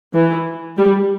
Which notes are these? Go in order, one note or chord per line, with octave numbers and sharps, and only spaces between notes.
E3
G3